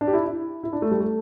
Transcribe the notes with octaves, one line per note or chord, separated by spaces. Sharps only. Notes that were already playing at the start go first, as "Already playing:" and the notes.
D4
G4
E4
E4
E4
D4
A3
G3
A3